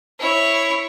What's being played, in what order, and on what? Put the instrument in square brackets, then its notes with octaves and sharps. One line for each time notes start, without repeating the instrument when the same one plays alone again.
[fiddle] E4 C#5